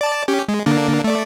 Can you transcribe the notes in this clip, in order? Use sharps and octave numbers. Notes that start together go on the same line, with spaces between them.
D5 A5
C#4 G4
G#3
D3 A#3 D4
A3 D5